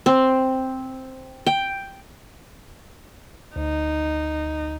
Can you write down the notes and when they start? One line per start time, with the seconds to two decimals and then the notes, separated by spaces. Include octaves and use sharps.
0.06 C4
1.47 G5
3.56 D2 D#4